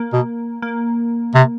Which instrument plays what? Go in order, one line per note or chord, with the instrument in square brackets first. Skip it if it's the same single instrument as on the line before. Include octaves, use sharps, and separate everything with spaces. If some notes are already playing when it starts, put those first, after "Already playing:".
Already playing: [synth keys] A#3
[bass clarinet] B2
[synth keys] A#3
[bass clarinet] C3